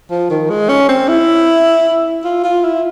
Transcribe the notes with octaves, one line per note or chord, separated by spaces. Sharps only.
F3
D#3
G#3
C#4
C4
E4
F4
F4
E4